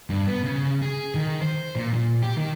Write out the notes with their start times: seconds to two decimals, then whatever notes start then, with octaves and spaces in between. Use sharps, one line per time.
0.10 G2
0.27 B3
0.44 C#3
0.82 G#4
1.15 D#3
1.41 C5
1.75 A#2
1.93 A#2
2.22 G4
2.37 D#3